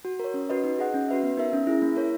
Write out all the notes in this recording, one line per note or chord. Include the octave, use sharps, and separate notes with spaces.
F#4
A#4 C#5
C#4
F#4 B4 D#5
D#4
G#4 D#5 F#5
C#4
F#4 B4 E5
B3
D#4 A#4 E5
C#4
E4 G#4
A#3
E4 A#4 C#5